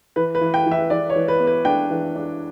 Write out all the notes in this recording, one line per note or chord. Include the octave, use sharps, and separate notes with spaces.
E3 B4
B4
E3
G5
E3
E5
E3 D5
C#5
E3
B4
B3
B4
D4 G5
E3
D4